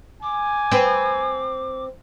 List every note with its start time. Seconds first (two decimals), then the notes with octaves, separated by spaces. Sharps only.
0.23 G#5 D6
0.72 C4 B4